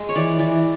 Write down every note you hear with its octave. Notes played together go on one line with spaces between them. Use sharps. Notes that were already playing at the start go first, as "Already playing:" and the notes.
Already playing: G#3
C#5
E3 D5
E3 D5